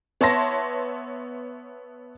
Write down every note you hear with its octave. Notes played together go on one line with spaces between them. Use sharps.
B3 C#5 E5 A5 C6 A#6